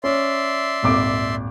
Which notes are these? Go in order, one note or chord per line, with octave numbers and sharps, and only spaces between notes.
C#4 D5 E5 C6
D#1 G#1 D6